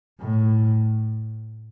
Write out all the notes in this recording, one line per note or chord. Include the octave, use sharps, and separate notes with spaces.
A2